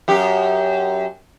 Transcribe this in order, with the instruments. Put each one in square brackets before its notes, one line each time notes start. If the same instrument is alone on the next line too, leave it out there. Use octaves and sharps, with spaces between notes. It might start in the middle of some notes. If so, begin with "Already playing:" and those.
[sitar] F#2 G4